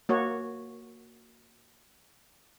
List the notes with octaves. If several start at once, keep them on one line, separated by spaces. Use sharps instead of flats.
A#3 F#4 C#5